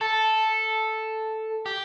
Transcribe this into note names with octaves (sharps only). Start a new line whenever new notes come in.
A4
G4